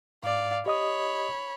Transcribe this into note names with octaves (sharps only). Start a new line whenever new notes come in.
G#2 D5 F5
G4 C#5 D#5 B5 D#6